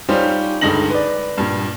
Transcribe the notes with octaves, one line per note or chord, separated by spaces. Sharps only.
G3 C#4 D#4 F4 G4 C5
C#2 G2 D3 D#4 A#6 F#7
B4 D5
G2 A#2